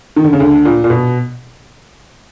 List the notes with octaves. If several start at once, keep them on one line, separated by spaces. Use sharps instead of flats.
D#3
D3
C#3
D2 D3
A#2
A#2
B2